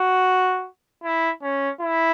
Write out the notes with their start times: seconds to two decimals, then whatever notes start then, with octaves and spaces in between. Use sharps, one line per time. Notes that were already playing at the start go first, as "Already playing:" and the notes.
Already playing: F#4
1.04 E4
1.43 C#4
1.81 E4